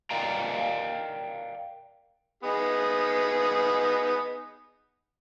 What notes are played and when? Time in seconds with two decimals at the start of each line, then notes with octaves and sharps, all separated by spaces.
0.10 A#4 D5 D#5 F5 G5 A#5
2.44 B3 D#4 G#4